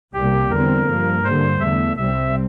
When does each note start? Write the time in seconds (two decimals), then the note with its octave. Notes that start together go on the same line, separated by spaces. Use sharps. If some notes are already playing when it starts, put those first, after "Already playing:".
0.13 C2 C3 G3 A#3 G4
0.50 E2 D3 G3 C4 A#4
0.87 G2 F3 A#3
1.23 G2 D3 G3 A#3 C5
1.60 E2 D3 A3 E5
1.97 C2 C3 G3 C4 E5